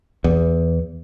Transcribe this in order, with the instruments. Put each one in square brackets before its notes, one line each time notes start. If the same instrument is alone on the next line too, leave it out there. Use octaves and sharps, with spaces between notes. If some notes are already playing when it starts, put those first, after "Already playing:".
[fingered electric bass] E2